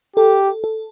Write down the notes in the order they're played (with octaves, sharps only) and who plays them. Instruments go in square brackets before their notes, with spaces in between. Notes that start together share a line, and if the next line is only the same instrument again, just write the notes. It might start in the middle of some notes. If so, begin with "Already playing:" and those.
[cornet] G4 [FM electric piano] A4
[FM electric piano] A4